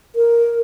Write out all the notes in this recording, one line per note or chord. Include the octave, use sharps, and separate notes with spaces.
A#4